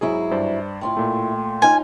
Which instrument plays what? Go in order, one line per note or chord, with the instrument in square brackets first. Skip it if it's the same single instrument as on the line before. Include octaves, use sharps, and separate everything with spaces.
[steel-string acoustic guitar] G#2 F#3 E4 [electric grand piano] G#4
[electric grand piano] G2 C5 D5
[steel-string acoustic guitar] A2 E4 F4 [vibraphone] G5 C6
[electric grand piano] A#2 A3
[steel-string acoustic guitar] C#4 D#4 F4 [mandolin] G#5